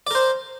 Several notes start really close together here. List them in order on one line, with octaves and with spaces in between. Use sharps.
D5 A#4 C5